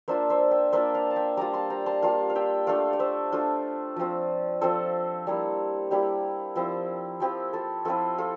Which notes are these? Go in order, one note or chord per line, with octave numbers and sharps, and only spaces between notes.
A#3 D4 F4 C5 E5
C5 E5
E5 G5
A#3 D4 F4 C5 E5
D5 F5
A5
E5 G5
G3 A#3 F4 A#5 D6
A5 C6
G5 A#5
A5 C6
G3 A#3 F4 F5 A5
F5
E5 G5
A3 D4 F4 D5 F5
D5
C5 E5
A3 D4 F4
F3 C4 F4
F3 C4 F4 A4 C5
G3 A#3 E4
G3 A#3 E4 G4
F3 C4 E4
F3 C4 E4 G4
F4 A4
F3 C4 E4 F4 A4
F4 A4